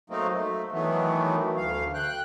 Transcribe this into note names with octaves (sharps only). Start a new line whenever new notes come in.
F#3 A3 A#3 C4 D#4
A3
D#3 E3 F#3 A3 B3
D2 F5
G5 F#6